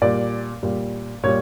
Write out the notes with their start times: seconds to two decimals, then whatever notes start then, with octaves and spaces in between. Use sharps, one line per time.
0.02 A#2 G3 D5
0.63 A#2 G3
1.24 A#2 G3 C#5